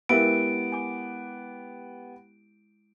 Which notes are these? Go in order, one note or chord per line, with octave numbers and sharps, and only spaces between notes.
G#3 B3 E4 G4 A#4 E5 F5 D7
G#5 D6